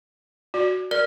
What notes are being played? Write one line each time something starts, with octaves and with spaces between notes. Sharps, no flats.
F#4 D5
A#4 D5 F6